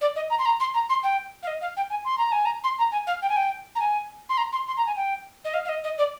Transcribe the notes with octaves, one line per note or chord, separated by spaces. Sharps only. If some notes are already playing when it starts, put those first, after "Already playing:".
D5
D#5
A#5
C6
A#5
C6
A#5
C6
G5
F5
D#5
F5
G5
G#5
C6
A#5
G#5
A#5
C6
A#5
G#5
F5
G5
G#5
G5
A#5
G#5
C6
A#5
C6
C6
A#5
G#5
G5
D#5
F5
F5
D#5
D#5
D5